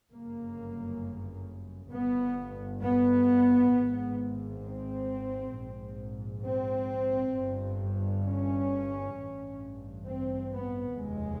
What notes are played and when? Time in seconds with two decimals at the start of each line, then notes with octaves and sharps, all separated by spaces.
0.11 G1 F#2 C#3 A#3
1.91 G1 G2 B3
2.82 B3
3.73 G#1 G#2
4.64 C4
5.55 A#1 G#2
6.45 C4
7.35 G1 G2
8.26 C#4
9.16 A1 G2
10.07 C4
10.52 B3
10.97 F1 D#2 C#3 G#3